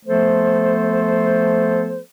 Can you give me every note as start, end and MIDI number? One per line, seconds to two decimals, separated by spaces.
0.06 2.00 53
0.06 2.00 57
0.06 2.00 59
0.06 2.00 69
0.06 2.00 72